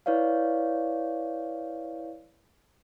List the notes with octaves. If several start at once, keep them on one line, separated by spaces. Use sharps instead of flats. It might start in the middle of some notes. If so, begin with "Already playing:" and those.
E4 B4 C#5 D5 F5